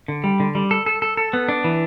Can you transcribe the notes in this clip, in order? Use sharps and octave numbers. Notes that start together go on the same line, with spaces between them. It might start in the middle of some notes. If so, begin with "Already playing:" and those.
D3
G3
D3
G3
A4
A4
A4
A4
B3
D4
E3